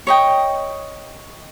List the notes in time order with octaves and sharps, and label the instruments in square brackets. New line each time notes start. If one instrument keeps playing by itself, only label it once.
[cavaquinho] C#5 D#5 G5